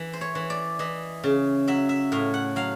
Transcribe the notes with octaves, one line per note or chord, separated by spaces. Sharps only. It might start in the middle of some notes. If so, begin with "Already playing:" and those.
Already playing: E3
C5
C#5
E3
D5
E3 D#5
C#3
F#3 E5
E5
A2 F5
F#5
F#3 F5